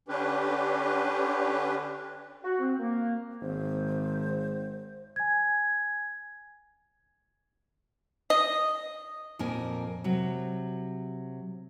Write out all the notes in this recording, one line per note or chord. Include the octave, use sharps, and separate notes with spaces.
D3 C#4 D4 G4 B4
F#4
C4
A#3
G#1 C5
G#5 G#6
D#5
F2 A#2 A#3 A#4 G#5
C3 F#3